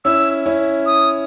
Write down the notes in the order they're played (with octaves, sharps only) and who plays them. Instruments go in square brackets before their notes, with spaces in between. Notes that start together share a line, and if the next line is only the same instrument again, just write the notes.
[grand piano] C#4 E4 [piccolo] E6
[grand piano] C#4 E4
[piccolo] D#6